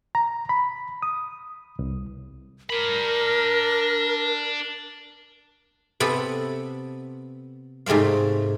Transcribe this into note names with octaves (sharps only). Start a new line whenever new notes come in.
A#5
B5
D#6
C2
D4 A#4 B5
C3 B3 A4
G#2 C3 A3 C4 F5